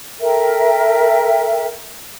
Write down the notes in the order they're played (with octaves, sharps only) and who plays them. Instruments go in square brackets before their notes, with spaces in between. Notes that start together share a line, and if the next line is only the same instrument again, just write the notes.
[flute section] A4 A#4 E5 G5